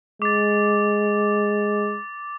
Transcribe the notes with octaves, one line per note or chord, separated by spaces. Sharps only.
G#3 D6 A6